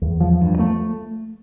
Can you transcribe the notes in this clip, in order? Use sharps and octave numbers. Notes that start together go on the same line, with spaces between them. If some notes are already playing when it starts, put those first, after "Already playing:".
E2
F3
G2
A3